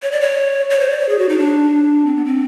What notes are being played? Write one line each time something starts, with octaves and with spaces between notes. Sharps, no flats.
C#5
D5
C#5
C#5
C5
D5
C#5
G#4
F#4
D#4
D4
C4
B3
C4